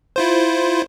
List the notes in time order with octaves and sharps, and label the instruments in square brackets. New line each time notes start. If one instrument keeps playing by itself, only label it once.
[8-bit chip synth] E4 F4 C5